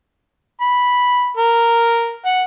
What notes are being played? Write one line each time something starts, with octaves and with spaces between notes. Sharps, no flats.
B5
A#4
F#5